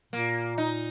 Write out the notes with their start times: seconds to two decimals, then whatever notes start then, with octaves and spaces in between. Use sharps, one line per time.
0.13 A#2 A#3
0.58 D#4